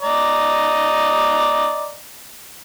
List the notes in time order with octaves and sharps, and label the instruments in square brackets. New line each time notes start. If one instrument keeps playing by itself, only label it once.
[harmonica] D5 D#5 A#5